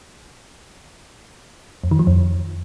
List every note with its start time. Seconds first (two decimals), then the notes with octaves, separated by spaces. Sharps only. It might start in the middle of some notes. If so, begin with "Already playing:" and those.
1.84 F2
1.91 D#3
1.99 F3
2.07 F2